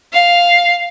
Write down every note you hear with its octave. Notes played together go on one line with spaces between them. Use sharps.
F5